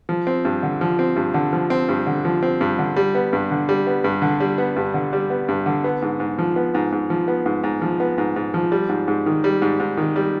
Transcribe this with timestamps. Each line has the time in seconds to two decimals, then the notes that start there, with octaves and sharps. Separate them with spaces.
0.09 F3
0.27 C4
0.45 G2
0.63 D3
0.81 F3
0.99 C4
1.16 G2
1.34 D3
1.53 F3
1.70 C4
1.89 G2
2.07 D3
2.25 F3
2.43 C4
2.61 G2
2.79 D3
2.96 G3
3.15 B3
3.33 G2
3.51 D3
3.69 G3
3.87 B3
4.04 G2
4.22 D3
4.40 G3
4.58 B3
4.76 G2
4.94 D3
5.13 G3
5.30 B3
5.48 G2
5.66 D3
5.84 B3
6.02 G#2
6.20 G#2
6.38 F3
6.56 B3
6.75 G#2
6.92 G#2
7.10 F3
7.28 B3
7.46 G#2
7.64 G#2
7.82 F3
8.00 B3
8.18 G#2
8.36 G#2
8.54 F3
8.72 G3
8.89 G#2
9.08 G#2
9.26 D#3
9.44 G3
9.62 G#2
9.80 G#2
9.97 D#3
10.16 G3